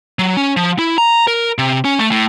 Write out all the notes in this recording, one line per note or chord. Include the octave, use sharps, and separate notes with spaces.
F#3
C#4
F3
E4
A#5
A#4
C3
C#4
A3
A2